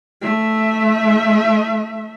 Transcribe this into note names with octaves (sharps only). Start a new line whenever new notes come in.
A3 E5